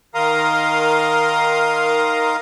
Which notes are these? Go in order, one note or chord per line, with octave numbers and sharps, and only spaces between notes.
D#3 A#4 F5 A#5 C6 D#6